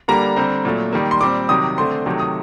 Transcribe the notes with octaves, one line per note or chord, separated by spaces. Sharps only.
D3 G3 A#3 A#5
D3 G3 C4
A#2 F#3 A3
D#3 G3 A#3
C6
A#2 G3 C4 D6
C3 D#3 F#3 D#6
D3 A3 C4 C6
C3 D#3 F#3 A3
D#6